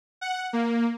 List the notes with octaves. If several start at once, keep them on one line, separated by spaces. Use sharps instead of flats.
F#5
A#3